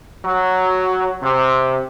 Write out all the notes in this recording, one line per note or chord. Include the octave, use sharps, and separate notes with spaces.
F#3
C3